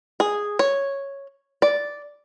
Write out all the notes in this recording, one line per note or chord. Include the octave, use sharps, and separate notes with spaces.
G#4
C#5
D5